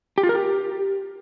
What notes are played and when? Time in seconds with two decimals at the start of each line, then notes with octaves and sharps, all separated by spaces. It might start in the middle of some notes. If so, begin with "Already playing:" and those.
0.18 G4
0.23 F4
0.29 A#4
0.35 G4